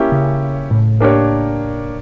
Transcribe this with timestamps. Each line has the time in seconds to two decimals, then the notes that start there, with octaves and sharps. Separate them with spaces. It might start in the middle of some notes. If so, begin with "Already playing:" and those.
Already playing: A#3 C#4 E4 G4 C#5
0.12 C#3
0.71 A2
1.00 A#3 D4 G4 A#4 C#5